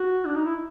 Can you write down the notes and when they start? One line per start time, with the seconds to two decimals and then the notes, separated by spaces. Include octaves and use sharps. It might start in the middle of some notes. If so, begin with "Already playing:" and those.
Already playing: F#4
0.25 D4
0.35 D#4
0.45 E4